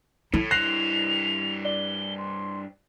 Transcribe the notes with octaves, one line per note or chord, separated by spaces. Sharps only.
A2 E4
G2 C5 F#6 A#6 C7 F7
D5 G7
C6